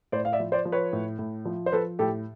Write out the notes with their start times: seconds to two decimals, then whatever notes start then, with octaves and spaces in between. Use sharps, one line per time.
0.12 A2 C5 D5
0.25 F5
0.33 D5 E5
0.40 F3
0.52 C5 D5
0.65 F3
0.72 B4 C#5
0.93 A2
1.19 A2
1.45 F3
1.66 C5
1.72 F3 A4 B4
1.99 A2 G4 A4